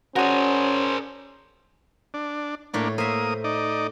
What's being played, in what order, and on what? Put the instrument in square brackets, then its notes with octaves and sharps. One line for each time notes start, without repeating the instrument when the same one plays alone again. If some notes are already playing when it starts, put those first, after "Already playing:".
[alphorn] C#4 [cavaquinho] F#4 D5 [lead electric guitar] G#4 A#4 [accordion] C5 G#5
[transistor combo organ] D4
[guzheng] A2 A3 C#5 [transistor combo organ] A#3 D4
[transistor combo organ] A#3 D#6 [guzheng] C5 E5
[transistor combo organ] D#4 D5